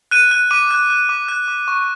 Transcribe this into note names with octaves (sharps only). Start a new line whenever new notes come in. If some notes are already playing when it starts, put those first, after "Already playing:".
F#6 D#7
F#6 D#7
D6 D#7
F#6
F#6
D6
F#6
D6
C#6